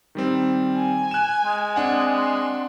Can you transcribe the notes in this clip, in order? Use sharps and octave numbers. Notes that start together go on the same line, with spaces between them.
D#3 G3 C4
G#5
F#6 E7
G#3
C4 D4 F#5
C6